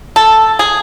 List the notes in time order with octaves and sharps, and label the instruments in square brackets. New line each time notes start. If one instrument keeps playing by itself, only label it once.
[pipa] A4
G#4